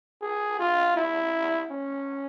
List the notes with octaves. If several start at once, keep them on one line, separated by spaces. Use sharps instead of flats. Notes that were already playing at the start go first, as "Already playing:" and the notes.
G#4
F4
E4
C#4